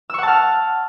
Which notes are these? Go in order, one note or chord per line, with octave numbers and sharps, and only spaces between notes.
F#5 A5 C#6 E6 F6